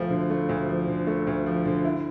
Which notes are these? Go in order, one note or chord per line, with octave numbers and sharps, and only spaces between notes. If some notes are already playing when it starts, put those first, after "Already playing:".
Already playing: D2 F3 A3
D3
A3
D2
F3
D3
A3
D2
F3
D3
E4